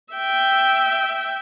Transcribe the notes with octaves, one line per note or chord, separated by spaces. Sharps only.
E5 G5